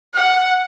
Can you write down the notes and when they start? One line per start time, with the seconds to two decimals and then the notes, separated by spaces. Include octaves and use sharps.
0.14 F#5